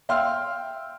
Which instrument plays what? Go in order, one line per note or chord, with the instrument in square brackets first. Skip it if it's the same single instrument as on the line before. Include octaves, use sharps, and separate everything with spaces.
[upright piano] E5 F5 G5 C6 E6 F6